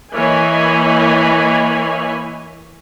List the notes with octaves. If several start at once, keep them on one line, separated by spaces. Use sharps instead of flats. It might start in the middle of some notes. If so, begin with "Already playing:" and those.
E3 A#3 C#5 D#5 G#5 B5